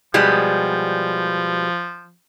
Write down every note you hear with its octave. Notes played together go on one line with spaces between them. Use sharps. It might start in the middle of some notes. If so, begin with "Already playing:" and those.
B2 F3 G3 G#3